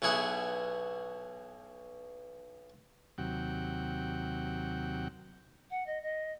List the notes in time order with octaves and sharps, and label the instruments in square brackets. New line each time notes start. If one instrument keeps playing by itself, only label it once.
[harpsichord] B1 B2 E4 G#4 F#5
[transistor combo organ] D#2 C3 F#3 F#5 G5
[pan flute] F#5
D#5
D#5